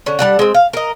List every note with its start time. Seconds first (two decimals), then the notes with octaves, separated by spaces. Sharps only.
0.06 D3 C#4
0.19 G3 D4 F#5
0.39 G#3 C4
0.54 F5
0.73 A#4 D#5